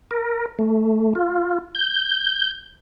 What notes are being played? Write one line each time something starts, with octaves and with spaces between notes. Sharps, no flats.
A#4
A3
F4
G6